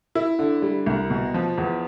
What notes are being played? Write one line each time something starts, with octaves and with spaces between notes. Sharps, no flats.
E4
D3
G3
C2
B2
F3
E2